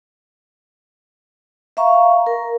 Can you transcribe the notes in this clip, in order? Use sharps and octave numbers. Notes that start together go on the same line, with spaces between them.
E5 F5 A#5 C#6
A#4